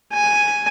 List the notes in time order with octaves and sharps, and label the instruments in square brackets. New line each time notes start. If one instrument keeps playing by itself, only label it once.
[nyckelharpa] G#5